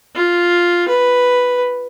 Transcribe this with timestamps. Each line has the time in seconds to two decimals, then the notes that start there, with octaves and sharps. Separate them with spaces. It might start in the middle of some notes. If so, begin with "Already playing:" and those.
0.15 F4
0.88 B4